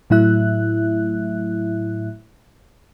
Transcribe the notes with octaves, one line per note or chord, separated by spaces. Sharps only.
A2 F#3 A3 E4 E5 F#6